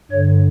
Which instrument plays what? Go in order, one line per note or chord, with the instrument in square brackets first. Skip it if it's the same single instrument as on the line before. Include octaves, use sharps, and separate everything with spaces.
[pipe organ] G2 D3 C#5